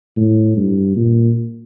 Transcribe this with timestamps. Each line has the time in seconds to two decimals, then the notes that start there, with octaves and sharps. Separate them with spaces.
0.17 A2
0.57 G2
0.96 A#2